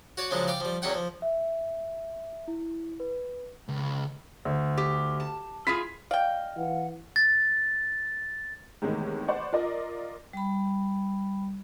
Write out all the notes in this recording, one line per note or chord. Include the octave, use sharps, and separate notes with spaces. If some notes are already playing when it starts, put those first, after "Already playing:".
F#4 C#5 D5
C#3 F3 F#3 G#3 D4
D5 F5 G5 D6
F3 G3
E2 D#3 F#3 C#4 F#5 G5
F3
E5
E4
B4
C#2
D2
G4
A5
E4 F4 G#4 B6
D5 D#5 F5 G5
E3 F#5
A6
E2 A2 C3 D#3 G#3
B4 C5 D5 F#5 C#6
F4 A#4 D5 D#5
G3 B5